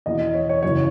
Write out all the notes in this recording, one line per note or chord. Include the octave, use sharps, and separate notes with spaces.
E2 B2 D#5
C#5
C#5
F#2 C#3 E3 C#5